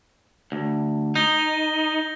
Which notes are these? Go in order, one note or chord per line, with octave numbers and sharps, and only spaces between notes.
D2
D#4 G6 A#6 G7